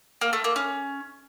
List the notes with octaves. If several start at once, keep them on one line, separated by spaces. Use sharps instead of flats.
A#3
A3
A#3
C#4